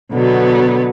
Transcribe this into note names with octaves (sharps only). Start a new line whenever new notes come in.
B2 D3 F#3 B3